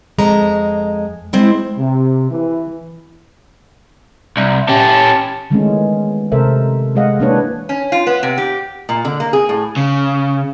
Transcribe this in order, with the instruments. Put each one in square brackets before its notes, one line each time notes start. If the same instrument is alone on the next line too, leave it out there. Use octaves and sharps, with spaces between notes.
[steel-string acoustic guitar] F2 G#3 A#5
G#3 C4 E4
[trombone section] C3
E3
[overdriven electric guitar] C2
[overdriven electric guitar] C#4 G4 [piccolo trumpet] A5
[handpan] D#3 E3 G#3 A3 B3 C#4
C3 A4 A#4 C5 E5
G#3 G#4 D#5 F5 F#5
E3 A#3 D4 B4 C#5
[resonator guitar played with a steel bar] C#4
F4
B3
C3
G4
A#2
D3
A#3
G#4
A2
[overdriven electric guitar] C#3